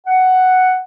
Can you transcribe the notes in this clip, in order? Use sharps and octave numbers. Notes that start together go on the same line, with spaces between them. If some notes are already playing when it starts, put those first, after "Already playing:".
F#5